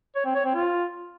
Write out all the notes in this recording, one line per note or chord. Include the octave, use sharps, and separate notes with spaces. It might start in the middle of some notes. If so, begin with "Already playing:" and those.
C#5
C4
C#5
C4
F4